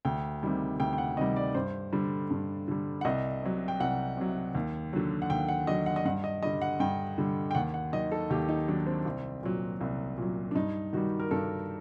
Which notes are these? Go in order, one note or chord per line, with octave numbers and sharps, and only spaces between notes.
D2 G5
C3 D#3 G3
D2 G5
G5
F#5
C3 D#3 G3 D#5
D5
G2 C5
D3 G3
G2
D3 G3
F#5
C2 D#5
C3 F#3
G5
C2 F#5
C3 F#3
D#2
D3 F#3
F#5
D#2 G5
F#5
D3 F#3 D#5
F#5
D#5
G2 F#5
D#5
D3 G3 D#5
F#5
G2 G5
D3 G3
G5
D#2 F#5
F#5
D#3 F#3 D#5
A4
D#2 G4
D#4
D#3 F#3 D4
C4
C2
A#2 F#3
C2
A#2 F#3
D4
G2 D#4
D#3 G3 F#4
A#4
G2 A4